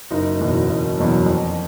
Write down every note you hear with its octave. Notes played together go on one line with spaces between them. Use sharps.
F#1 D#4
E2 B2 F#3
F#1
E2 B2 F#3
F2